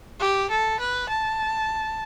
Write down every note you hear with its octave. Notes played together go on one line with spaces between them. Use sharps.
G4
A4
B4
A5